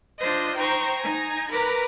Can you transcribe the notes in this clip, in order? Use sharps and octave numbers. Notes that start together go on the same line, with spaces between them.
D4 F4 C5 D#5
D#4 C5 G5 A#5 C#6
D#4 G#5 A#5
A#4 B4 A#5 B5 D6